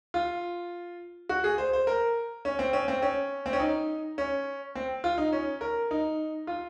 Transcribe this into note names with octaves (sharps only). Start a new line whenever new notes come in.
F4
F#4
G#4
C5
C5
A#4
C#4
C4
C#4
C4
C#4
C4
C#4
D#4
C#4
C4
F4
D#4
C#4
A#4
D#4
F4